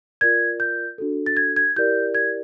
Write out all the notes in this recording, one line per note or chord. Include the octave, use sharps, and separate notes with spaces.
F4 A#4 D5 G#6
G6
D4 F#4 A4
A6
G#6
G#6
E4 G4 A#4 D5 G6
G#6